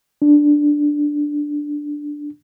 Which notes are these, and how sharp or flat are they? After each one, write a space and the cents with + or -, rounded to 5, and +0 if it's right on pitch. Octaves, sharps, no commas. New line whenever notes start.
D4 +0